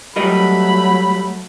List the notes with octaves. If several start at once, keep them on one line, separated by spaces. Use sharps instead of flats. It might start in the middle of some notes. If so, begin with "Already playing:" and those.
F#3 G3 A3 A#4 D#5 B5